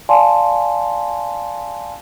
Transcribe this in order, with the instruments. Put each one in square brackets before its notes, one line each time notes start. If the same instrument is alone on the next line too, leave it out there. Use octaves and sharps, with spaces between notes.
[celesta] D5 F5 G#5 A5 C6